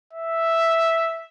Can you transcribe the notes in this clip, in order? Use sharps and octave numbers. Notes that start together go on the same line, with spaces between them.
E5